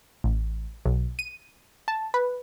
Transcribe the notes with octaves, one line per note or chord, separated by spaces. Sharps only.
A1
B1
D#7
A5
B4